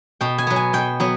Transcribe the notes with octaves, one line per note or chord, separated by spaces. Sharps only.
B2 G5
G#5
F#3 B3
G#5
B2 G5
F#3 B3